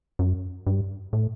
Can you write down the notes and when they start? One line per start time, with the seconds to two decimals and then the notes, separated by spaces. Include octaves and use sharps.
0.19 F#2
0.67 G2
1.13 A2